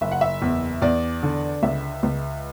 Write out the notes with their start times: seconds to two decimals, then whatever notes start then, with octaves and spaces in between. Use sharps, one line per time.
0.01 F#1 E5
0.11 F#5
0.21 E5
0.42 E2
0.82 E2 D5
1.23 D3
1.63 C#2 E5
2.03 C#2